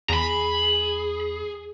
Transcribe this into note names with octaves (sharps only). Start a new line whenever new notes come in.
E2 G#4 A#5 B5